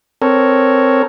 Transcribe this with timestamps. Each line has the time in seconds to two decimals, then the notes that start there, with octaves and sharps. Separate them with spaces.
0.22 C4 A4 A#4 C#5